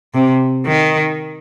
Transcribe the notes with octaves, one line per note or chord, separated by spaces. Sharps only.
C3
D#3